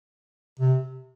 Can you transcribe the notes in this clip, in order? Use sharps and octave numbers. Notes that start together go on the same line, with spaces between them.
C3